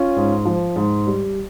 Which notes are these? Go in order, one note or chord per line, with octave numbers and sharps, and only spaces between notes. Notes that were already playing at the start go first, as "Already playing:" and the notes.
Already playing: C#4 F4
G#2
F3
G#2
G3